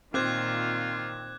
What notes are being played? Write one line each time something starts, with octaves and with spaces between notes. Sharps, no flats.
A#2 D#3 C4 F4 D6 F#6 G#6